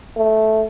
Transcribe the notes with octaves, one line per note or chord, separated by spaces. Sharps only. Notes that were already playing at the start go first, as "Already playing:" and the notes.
A3